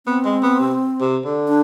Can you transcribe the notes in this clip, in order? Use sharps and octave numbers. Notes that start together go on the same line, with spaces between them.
B3 C4
G#3
B3
C3
C3
D3
D4